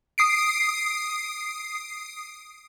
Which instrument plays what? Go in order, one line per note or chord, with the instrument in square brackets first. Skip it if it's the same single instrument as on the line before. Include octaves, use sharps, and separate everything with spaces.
[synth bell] D#6 C7 D7